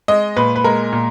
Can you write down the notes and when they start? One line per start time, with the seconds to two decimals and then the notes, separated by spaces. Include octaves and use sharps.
0.08 G#3 D#5
0.36 A#2 B4
0.56 B4
0.64 G#3 A#4
0.93 A#2